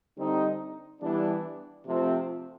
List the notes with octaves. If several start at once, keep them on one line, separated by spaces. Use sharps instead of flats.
D3 G3 C4 D#4
E3 G3 B3 D4
C3 F3 A3 C4 F4